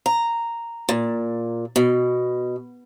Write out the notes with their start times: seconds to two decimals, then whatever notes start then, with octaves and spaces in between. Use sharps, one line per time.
0.06 A#5
0.89 A#2
1.76 B2